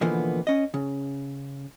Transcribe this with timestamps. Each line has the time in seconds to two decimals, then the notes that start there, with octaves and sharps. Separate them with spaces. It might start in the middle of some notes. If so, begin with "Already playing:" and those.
0.01 B2 D3 E3 F3 A#3 B3
0.47 C#4 D#5
0.74 C#3